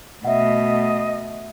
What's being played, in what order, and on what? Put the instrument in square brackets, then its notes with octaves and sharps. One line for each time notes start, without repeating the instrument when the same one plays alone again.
[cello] B2 A3 [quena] D#5 [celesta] E5 F#5